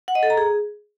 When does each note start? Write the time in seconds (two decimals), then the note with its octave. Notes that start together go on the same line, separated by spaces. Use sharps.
0.08 F#5
0.15 D#5
0.23 A4
0.30 A#5
0.37 G#4